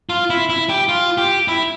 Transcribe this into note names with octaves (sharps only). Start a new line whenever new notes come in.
F4
E4
E4
G4
F4
G4
E4